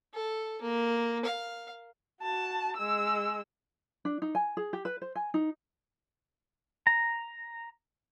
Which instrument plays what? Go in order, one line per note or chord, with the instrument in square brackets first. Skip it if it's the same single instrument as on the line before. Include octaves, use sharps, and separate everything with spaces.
[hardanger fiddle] A4
A#3
F5
[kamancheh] F#4 A5
G#3 E6
[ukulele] D4
D#4
G#5
G#4
G4
B4
C5
G#5
D#4
[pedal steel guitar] A#5